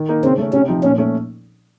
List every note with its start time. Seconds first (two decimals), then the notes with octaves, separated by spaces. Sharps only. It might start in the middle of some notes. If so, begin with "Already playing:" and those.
Already playing: D#3
0.09 A#3 D#4
0.23 C#3 C4
0.38 A3 C#4
0.53 C3 C#4
0.68 F3 C4 D#4
0.83 A#2 C#4
0.98 A3 C#4